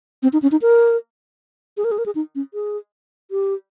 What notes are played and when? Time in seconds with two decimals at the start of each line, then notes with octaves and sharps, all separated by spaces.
0.23 C4
0.33 D#4
0.42 C#4
0.52 D#4
0.62 A#4
1.77 G#4
1.84 A#4
1.91 G#4
1.98 A#4
2.06 G#4
2.15 D#4
2.35 C#4
2.54 G#4
3.31 G4